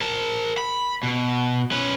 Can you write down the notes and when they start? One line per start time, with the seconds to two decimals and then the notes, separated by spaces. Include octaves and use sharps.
0.01 A#4 A5
0.58 B5
1.03 B2
1.71 C#4 B4